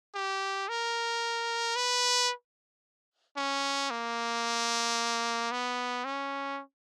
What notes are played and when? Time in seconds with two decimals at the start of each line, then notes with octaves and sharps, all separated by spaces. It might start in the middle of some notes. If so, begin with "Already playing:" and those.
0.15 G4
0.69 A#4
1.76 B4
3.37 C#4
3.91 A#3
5.52 B3
6.05 C#4